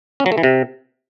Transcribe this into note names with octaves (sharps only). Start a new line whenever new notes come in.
C#4
F#3
A3
E3
C3